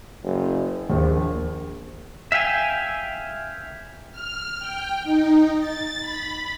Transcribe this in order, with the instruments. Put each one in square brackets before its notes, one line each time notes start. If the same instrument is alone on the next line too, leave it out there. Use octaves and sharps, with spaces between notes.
[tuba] F#1
[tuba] A#1 [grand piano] D#2
[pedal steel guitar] E5 F5 G5 G#5
[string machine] F6
G5
D#4
A6
B5